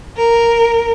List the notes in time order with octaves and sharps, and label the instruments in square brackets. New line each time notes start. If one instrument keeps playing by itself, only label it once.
[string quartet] A#4